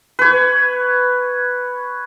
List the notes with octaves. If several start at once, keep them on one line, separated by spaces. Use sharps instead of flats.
B4 C#5